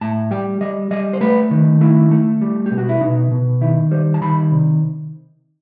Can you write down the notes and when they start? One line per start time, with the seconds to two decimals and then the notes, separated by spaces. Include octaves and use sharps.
0.01 A2 A5
0.31 G3 G5
0.61 G3 D#5
0.91 G3 D#5
1.13 C5
1.21 A3 B4
1.51 D#3
1.81 A3 E4
2.11 A3
2.41 G3
2.66 G4
2.71 B2
2.78 F#4
2.89 E4
3.01 B2 D#4
3.31 B2
3.61 D#3 E4
3.91 G3 C5
4.14 A5
4.21 D#3 B5
4.51 C3